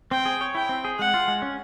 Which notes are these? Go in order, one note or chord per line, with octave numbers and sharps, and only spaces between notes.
C4 G5
G#4
C#5
E4 G5
C4
G#4
G#3 F#5
F4
G#3
C#4